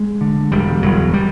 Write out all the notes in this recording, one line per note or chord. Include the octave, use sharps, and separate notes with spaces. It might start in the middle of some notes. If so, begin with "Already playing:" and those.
Already playing: G#3
D3
E1 G3
E1 F#3
G3